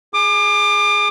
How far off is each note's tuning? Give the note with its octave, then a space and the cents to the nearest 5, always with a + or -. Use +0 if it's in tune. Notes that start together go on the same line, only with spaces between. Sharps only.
G#4 +0 D6 +35